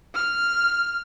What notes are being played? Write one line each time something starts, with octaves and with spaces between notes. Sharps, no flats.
F6